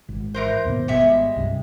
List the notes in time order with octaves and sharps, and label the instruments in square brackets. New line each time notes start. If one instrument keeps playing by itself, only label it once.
[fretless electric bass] G#1
[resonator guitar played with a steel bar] E3 A#4 C5
[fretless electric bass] D#2 G#2 B2
[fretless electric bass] G#1 B3 [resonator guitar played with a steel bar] G3 G#3 E5
[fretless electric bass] C2 G2